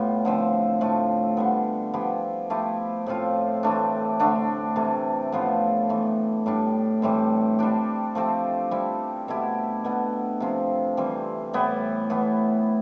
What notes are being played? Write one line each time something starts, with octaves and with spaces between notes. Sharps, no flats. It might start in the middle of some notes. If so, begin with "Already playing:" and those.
Already playing: A2 G3 A3 B3 F4
D3 F3 C4
A2 F3 A3
D3 G3 B3
F3 B3 E4 G4
F3 A3 E4 G4
A2 F3 C4 F4
E3 A3 D4
D3 A3 D4
C3 E3 A3
A2 F3 B3 F4
A2 E3 A3
A2 G3 D4 G4
A2 E3 G3 C4
G3 D4 G4
F3 A3 C4 G4
G3 C4 E4
B2 A3 E4 G4
B2 B3 D4
C3 F3 C4
E3 G3 C4
A2 G3 B3 E4
A2 E3 B3